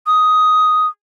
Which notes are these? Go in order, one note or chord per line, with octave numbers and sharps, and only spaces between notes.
D#6